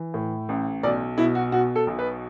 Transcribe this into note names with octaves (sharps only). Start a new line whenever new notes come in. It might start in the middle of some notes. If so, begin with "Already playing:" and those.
Already playing: E3
A2
A1
B1 D5
B2 E4
F#4
B2 F#4
A4
B1
B4